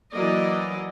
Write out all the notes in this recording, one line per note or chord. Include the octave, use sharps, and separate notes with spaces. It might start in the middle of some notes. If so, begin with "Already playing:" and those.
E3 F#3 A#3 D5 D#5